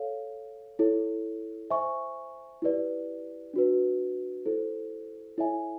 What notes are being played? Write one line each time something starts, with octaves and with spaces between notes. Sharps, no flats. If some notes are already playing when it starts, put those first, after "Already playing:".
Already playing: A4 C#5 F5
E4 A4 C#5
C5 E5 G#5 C#6
E4 G4 B4 D5
D4 F#4 B4
E4 A4 C5
E4 A4 C#5 E5 G#5